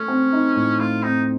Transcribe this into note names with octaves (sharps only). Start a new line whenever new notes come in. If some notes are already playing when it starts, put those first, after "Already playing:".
Already playing: A3 C#4
C4
D#4
A2
A3 F4
C4 D#4